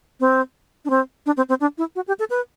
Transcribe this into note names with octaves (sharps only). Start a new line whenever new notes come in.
C4
D4
C4
D4
C4
C4
D4
E4
F#4
G4
A4
B4